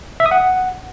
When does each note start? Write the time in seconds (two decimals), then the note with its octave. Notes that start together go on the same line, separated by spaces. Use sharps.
0.20 E5
0.26 D#6
0.31 F#5